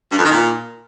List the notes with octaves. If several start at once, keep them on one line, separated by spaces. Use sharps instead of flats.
G2
F2
D#3
A#2